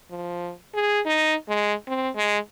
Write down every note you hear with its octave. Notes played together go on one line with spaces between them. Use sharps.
F3
G#4
D#4
G#3
C4
G#3